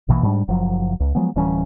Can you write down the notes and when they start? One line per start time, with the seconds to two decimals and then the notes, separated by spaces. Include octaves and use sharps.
0.08 A#1 B2 E3 A#3
0.23 G#2 G3 D4
0.48 F#1 F3 F#3
1.00 C#2
1.15 F3 F#3 G#3 B3
1.36 D1 E3 G3 C#4